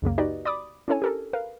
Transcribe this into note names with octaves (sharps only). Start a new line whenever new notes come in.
C#2 F#2 C#3 A#3
D#4 F#4 G4 B4 D5 D#5
D5 B5 D6 D#6
C#4 D4 E4 A4 C#5 G#5
G4 A4 A#4
A#4 B4 F5